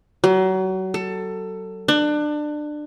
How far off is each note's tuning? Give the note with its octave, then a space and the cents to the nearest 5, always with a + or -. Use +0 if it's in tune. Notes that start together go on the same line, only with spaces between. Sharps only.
F#3 +30
A4 +20
D4 +25